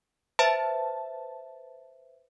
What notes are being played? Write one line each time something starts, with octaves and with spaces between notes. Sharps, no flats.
B4 C5 E5 A5